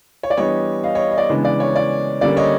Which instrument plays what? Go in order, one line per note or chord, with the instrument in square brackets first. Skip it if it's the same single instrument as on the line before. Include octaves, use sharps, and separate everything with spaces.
[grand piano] C#5
D5
E3 G3 B3 D4 C#5 D#5
D#5 F5
C#5 D#5
D#5
D5
C#3 E3 G#3 B3 D4
D5
C#5
D5
D3 G3 A#3 C#4 D5
C#5 D#5